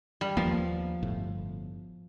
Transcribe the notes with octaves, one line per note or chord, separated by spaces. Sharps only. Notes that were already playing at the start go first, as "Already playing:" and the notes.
G3
D#2 F3 A#3 B3
G1 A2